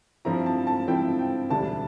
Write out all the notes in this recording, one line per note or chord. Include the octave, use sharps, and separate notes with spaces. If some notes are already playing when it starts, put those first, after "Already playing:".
G2 F3 C4 E4 A#5
A5
A5
G2 F3 C4 E4 G5
G5
E1 D2 D3 G3 D4 A5